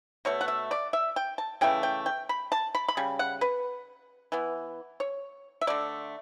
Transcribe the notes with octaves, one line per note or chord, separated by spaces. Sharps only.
B2 A3 C#5
F#5
E5
D5
E5
G5
A5
C#3 E3 A3 G5
G5
G5
B5
A5
B5
B5
C#3 G3
F#5
B4
E3 B3
C#5
E5
D3 A3 D5